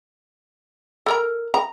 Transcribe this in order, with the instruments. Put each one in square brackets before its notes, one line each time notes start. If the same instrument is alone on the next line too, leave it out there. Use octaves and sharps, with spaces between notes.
[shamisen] A4 A#4 A#5
A#5